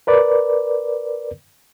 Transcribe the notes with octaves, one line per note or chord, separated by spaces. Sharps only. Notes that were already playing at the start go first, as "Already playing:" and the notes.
A#4 B4 D5